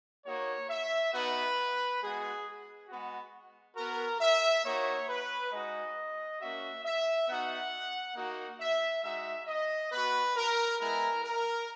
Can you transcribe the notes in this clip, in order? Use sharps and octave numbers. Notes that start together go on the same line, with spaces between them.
A#3 D#4 F#4 C#5
E5
B3 D#4 F#4 B4
G#3 B3 F#4 G#4
G#3 B3 F#4
B3 F#4 A#4
E5
A#3 D#4 F#4 C#5
B4
G#3 D#4 F#4 D#5
A#3 C#4 F#4 E5
E5
B3 D#4 F#4 F#5
A#3 D#4 F#4
E5
G#3 D#4 F#4 E5
D#5
B3 F#4 B4
A#4
G#3 B3 E4 A#4
A#4